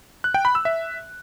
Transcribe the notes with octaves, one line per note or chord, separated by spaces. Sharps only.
F#6
G5
B5
E6
E5